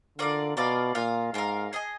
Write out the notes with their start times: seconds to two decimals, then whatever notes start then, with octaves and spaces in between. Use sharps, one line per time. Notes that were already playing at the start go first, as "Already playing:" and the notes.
0.18 D3 F4 A#4 D5 F5
0.56 B2 F4 A#4 D5 F5
0.95 A#2 F4 A#4 F5
1.34 G#2 F4 A#4 F5
1.73 G#4 D#5 G#5